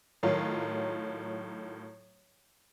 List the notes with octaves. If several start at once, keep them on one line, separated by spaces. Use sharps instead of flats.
A2 D#3 F#3 F4